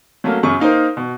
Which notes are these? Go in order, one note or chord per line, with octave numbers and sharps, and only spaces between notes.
F#3 A3 A#3 C#4
F#2 C#3 C#6
A#3 D#4 A#4 C5
B2